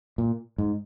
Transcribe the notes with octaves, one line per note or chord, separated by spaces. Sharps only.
A#2
G#2